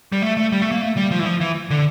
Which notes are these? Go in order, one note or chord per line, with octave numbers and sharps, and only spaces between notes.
G3
A3
A3
G3
A3
A#3
A3
G3
F3
E3
F3
E3
D3